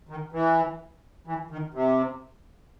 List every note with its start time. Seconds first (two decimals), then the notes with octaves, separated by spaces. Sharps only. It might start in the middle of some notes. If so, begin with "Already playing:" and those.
0.09 D#3
0.33 E3
1.27 E3
1.51 D#3
1.74 C3